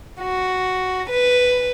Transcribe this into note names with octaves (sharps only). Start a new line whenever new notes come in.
F#4
B4